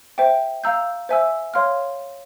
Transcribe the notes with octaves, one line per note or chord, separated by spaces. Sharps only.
C5 E5 G5
F5 A#5 E6 G6
C5 E5 G#5 E6
C#5 F5 C6 F6